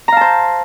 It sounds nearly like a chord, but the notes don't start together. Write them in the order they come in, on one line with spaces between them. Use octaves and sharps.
A#5 F5 A5 C5